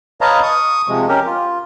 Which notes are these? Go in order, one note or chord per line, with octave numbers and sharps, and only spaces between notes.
B4 C#5 D#5 F5 A5 A#5
C#6 D#6
C3 F3 G#3
C#4 G4 A#4
F4